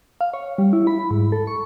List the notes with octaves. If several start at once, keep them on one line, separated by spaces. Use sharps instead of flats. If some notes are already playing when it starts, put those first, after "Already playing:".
F5
C#5
G3
E4
B5
G#2
A4
C#6